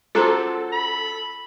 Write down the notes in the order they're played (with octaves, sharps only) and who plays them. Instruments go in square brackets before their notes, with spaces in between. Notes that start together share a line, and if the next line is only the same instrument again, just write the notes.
[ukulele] C#4 F#4 C5 [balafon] F4 G#4 A#5 [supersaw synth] A4
[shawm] B5